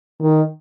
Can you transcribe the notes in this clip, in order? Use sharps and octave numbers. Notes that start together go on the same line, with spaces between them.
D#3